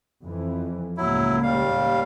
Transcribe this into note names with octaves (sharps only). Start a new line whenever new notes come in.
F2 E3
C#2 A2 F#3 A#3 E4
D#2 G3 F5